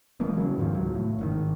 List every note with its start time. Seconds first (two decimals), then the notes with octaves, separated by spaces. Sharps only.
0.20 E3 G#3 A#3 B3
0.37 C#3 F#3
0.58 G#2 D#3 F3
0.73 C#2 F#3
0.94 A2
1.19 G#1 D3 D#3